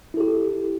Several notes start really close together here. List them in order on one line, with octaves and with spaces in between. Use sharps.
E4 A4 G4